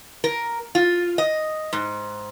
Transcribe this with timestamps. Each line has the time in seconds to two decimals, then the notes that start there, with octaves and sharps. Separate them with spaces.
0.24 A#4
0.75 F4
1.18 D#5
1.73 G#2